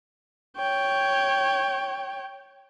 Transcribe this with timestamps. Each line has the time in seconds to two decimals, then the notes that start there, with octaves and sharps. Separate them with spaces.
0.57 C#5 G5